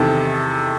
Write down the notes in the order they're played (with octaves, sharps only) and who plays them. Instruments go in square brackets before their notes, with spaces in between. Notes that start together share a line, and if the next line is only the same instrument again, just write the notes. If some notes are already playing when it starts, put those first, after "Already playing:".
Already playing: [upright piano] E2 C3 D#3 A4